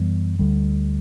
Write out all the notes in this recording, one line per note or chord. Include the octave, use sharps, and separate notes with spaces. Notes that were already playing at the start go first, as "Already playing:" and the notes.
Already playing: F#2 E3 G3 B3
D2 D3 G3